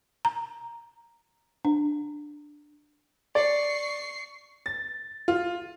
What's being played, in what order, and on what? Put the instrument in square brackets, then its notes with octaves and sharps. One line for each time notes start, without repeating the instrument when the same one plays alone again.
[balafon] A#5
D4
[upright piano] D5 [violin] C#6 C7
[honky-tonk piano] A6
F4